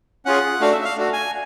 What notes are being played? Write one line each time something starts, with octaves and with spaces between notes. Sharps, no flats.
C#4 F4 G#4 F#5
A3 D4 F#4 F5
E5
F5
A3 D4 F#4
G#5